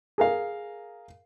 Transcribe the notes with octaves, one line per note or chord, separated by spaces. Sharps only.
G#4 A#4 F5